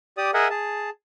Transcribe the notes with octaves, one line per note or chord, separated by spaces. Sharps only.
G4 D5 D#6
G#4 A#4 D#5 E5 F#5 G#5
G#4 A5